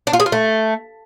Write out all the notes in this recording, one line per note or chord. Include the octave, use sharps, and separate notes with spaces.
D4
F4
G#4
F4
A3